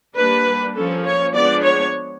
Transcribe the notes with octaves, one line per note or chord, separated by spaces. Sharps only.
G3 A#3 D4 B4
F3 A#3 C#4 A4
C#5
F3 G#3 B3 D4 D5
C#5